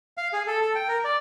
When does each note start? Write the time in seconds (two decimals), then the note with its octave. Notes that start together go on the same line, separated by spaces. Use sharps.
0.18 F5
0.33 G#4
0.47 A4
0.61 A4
0.75 G5
0.88 A#4
1.04 D5